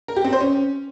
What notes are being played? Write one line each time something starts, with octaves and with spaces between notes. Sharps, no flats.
A#4
G4
C4
C5
C#4